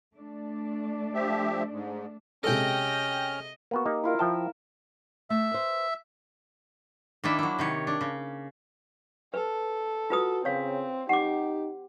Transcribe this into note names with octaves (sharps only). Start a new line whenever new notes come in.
A3 D4 D5
F3 G4 E5
G#2
C3 G#3 C#4 A4 D#5 G5 F6 A#6
A#3 B3 F#4
A#3 D#4 G4
E4 F4 A#4
F3 E5 G5 A5
A3 E5
B4 C5
D#3 A#3 D4 E4 E5
F#3 E4
C3 D#3 C#5
D4
C#3
A4 B4
F4 F#4 B4 D#6
C#3 C4 C#5 F5
D#4 G4 F#5 D6